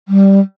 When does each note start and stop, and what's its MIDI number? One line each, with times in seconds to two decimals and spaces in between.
0.08 0.40 55